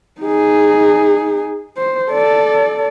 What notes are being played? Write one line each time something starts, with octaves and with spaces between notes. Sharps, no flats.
D#4 G#4
C5
A4 D5